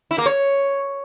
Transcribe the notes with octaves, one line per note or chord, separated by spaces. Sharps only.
E4
A#3
C#5